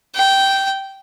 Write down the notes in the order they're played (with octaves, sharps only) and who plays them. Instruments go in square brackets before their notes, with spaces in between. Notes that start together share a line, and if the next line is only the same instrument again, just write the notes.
[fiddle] G5